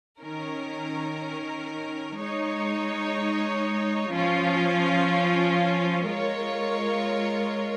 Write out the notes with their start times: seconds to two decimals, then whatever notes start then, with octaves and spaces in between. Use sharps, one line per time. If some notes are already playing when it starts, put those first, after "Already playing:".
0.21 D#3 C#4 A#4
2.17 G#3 D#4 C#5
4.11 F3 C#4 F4
6.07 G#3 F4 A#4 C#5